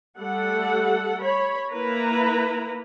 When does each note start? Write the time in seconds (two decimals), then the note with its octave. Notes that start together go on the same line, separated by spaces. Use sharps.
0.18 G3 A3 A4 F#5
1.22 C#5 B5
1.71 A#3 E4 B4 A#5